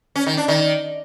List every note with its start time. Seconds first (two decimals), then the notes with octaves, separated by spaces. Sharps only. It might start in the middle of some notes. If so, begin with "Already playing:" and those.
0.16 C#4
0.26 D#3
0.37 D4
0.48 D#3